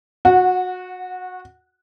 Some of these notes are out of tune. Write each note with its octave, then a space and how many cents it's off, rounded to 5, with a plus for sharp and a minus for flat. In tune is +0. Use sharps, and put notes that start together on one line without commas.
F#4 -20 F#5 +0